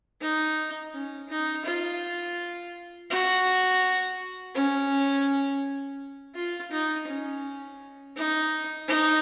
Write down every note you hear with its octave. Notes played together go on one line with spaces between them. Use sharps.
D#4
C#4
D#4
F4
F#4
C#4
F4
D#4
C#4
D#4
D#4